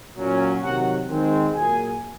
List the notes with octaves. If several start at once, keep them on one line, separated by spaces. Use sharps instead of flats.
A#2 F#3 C#4
C3 D#3 F#3 F#4 F#5
D#3 G#3 C4
A#2 F#3 A#3 G#4 G#5